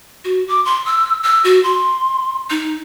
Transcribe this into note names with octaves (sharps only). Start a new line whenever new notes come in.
F#4
D6
C6
E6
E6
F#4
C6
D#4